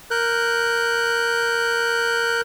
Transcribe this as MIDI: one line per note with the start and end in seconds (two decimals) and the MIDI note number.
0.11 2.41 70
0.11 2.41 90
0.11 2.41 91